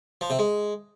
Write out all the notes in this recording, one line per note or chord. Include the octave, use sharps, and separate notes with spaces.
F3
C3
G#3